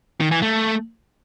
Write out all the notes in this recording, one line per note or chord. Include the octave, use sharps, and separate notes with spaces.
D#3
E3
A3